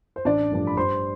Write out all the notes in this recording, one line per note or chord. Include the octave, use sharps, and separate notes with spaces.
C5
A1 D4 D5
G2 F3 A3 D4
B5
G2 C5 C6